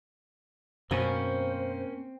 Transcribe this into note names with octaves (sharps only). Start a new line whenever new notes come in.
F#2 B2 A#3 C4 C#4 C5